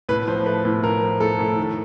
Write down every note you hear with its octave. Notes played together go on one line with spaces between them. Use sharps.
A2 B4
F3 C5
A3 B4
A2
A2 A#4
F3
A2 A4
A2
D#3